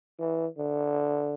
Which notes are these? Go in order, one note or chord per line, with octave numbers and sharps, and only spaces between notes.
E3
D3